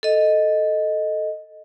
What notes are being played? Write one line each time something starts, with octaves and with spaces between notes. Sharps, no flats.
A4 D#5